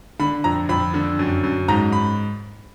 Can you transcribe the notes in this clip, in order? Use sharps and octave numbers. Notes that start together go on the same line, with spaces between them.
D3 B5
F2 A#5
F2 B5
D3
F#2
F#2
G#2 A#5
B5